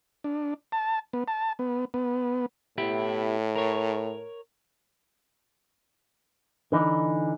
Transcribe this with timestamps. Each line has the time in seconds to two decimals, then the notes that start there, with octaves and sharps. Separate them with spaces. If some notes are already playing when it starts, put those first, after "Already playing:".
0.24 D4
0.72 A5
1.13 B3
1.28 A5
1.59 B3
1.94 B3
2.78 A2 B3 E4 G4
3.56 A#4 C#5
6.72 D3 E3 D#4